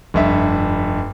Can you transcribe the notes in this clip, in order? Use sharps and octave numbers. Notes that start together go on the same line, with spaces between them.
F1 G2 E5